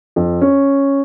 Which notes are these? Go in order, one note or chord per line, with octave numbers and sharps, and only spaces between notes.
F2
C#4